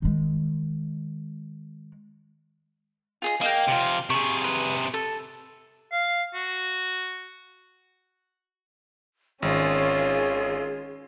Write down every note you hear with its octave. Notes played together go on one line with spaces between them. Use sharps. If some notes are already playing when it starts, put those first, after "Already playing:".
D#3 G#3
F4 G#4 D#5
A#3 D#5 F5 G5
C3 F4
C3 G#4 C#6
B4
A4
F5
F#4
G#1 D#3 C#4 F4 G#4